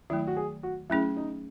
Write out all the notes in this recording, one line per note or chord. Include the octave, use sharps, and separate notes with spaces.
D#3 F#3 A3 E4
F#4
G#4
F#4
F#3 A3 C#4 E4 G#4
D#4